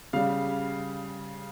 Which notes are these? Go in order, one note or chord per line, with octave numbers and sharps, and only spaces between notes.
C#3 G3 F5